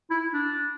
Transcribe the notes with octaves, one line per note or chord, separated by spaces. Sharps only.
E4
D4